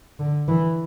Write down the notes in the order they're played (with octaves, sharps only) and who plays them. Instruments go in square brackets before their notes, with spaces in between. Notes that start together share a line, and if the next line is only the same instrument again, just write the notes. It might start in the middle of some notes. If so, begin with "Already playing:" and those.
[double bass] D3
E3